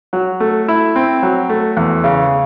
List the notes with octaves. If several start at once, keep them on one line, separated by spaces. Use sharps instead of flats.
F#3
A3
E4
C4
F#3
A3
E2
C#3